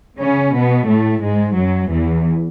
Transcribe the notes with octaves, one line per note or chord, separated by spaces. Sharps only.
C#3 C#4
B2 B3
A2 A3
G#2 G#3
F#2 F#3
E2 E3